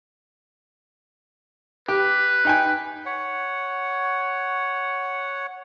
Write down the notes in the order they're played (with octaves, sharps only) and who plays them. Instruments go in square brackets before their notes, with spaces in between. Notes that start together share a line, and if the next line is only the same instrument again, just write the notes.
[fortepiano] G4 [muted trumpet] B4
[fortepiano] D#4 G5 G#5
[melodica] C#5 F#5